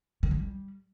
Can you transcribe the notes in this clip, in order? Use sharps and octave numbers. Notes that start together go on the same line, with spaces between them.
D3
G#3
G3